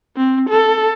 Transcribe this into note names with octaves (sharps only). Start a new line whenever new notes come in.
C4
A4